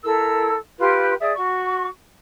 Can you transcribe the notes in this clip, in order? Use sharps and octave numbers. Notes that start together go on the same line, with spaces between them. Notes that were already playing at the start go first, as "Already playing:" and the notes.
E4 A4 A#4 E6
F4 G4 B4 C6
G#4 D5 E5 D#6
F#4 C#6